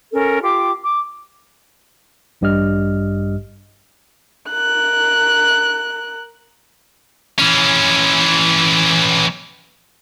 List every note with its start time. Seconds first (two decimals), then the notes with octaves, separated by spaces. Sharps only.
0.12 C#4 A4 A#4
0.43 F4 G4 G5 D6
0.86 D6
2.41 A1 G2 G3 G4 D#5 F6
4.51 A#4 F#6
7.39 E3 C#4